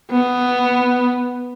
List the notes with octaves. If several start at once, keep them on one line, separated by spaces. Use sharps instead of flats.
B3